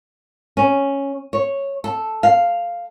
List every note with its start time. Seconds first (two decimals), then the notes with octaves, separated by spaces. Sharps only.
0.57 C#4
1.33 C#5
1.84 A4
2.23 F5